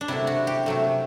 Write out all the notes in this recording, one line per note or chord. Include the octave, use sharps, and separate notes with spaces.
D4
C3 F#3 A3 E4
F#4
G4
C3 F#3 A3